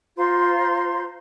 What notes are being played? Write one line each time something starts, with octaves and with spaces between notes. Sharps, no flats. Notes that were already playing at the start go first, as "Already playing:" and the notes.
F4 C5 A#5 C6